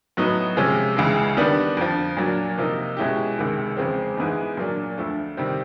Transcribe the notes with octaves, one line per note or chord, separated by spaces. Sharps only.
A2 F#3 B3 D#4
C3 F3 G#3 C#4
C#2 C#3 E3 G#3
D#3 G3 B3 D4
F2 D3 F3
A#2 F#3 A#3 D4
C3 F3 A#3 D#4
B2 G#3 C#4 E4 G4
C#2 C3 D#3 G#3
E2 C#3 F3 G#3 C4
G#2 E3 G#3 B3 D#4
A#2 F#3 A#3 D4
D2 D3 F3 A3
C3 D#3 G3 C4